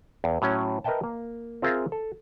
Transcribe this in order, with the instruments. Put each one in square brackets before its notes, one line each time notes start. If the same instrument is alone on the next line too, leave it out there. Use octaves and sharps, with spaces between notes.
[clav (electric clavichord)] E2
A2 F#3 C#4
A#4 B4 D#5 E5 G5 A5
A#3
C4 F4 G#4 A#4 E5 F5
A4